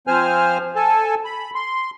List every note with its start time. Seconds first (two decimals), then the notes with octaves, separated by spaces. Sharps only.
0.07 F3 C4 C5 G#5 F6
0.76 A4 G#5 A5
1.25 B5
1.55 C6